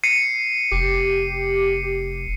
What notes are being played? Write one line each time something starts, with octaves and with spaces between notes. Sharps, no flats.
C7 C#7 D#7
F1 G4